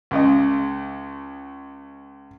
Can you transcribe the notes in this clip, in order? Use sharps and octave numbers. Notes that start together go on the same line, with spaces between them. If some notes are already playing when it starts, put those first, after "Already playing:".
C#2 C#3 D#5